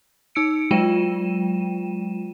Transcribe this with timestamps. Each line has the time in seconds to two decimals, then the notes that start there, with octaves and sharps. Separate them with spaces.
0.35 D#4 E6 C#7 D7
0.71 F#3 G#3 F4 G5 D#7 E7